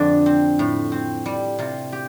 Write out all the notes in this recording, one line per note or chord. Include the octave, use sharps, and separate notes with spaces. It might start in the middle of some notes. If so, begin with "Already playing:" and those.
Already playing: F2 D3 D4
C4
A2
C4
G3
C3 F4
G4